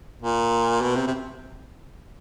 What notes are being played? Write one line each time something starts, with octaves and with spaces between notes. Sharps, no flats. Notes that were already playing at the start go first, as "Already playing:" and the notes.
A#2
B2
C3
C3